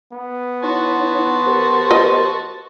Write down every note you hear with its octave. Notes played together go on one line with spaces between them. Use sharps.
B3
D#4 E4 F#4 C#5 A5 C6
G4 A#4 C5
B4 D#5